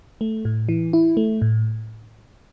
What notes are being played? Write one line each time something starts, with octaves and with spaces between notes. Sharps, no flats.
A3
A2
E3
E4
A3
A2